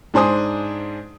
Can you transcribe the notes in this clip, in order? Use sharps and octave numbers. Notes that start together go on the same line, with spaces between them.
G#2 D4 C5 G#5 D#6